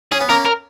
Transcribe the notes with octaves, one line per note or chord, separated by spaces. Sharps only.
C#4 G#4
B3
A#3 C#4 A#4
A#4